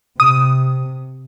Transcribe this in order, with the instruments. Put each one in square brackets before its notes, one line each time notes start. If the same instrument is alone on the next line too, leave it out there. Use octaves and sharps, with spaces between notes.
[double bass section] C3 [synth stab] D#6